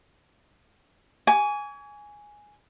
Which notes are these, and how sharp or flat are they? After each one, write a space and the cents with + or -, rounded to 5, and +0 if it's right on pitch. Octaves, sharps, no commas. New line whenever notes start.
G#5 +0 C#6 +45